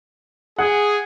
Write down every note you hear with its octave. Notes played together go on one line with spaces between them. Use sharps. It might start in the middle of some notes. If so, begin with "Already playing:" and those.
G#4 F#5